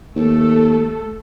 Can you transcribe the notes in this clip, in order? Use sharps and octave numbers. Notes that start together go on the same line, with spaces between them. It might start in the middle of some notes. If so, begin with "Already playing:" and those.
D#2 A3 A4